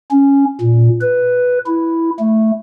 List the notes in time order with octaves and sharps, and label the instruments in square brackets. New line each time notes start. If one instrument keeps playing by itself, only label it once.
[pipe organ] C#4
A#2
B4
E4
A3